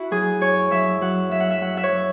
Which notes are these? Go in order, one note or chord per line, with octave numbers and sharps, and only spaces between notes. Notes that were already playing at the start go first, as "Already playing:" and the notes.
Already playing: E4 F#4
F#3 G#4
F#2 C#5
F#3 E5
F#3 F#5
F#3 E5
F#5
E5
F#3 F#5
E5
C#5
F#3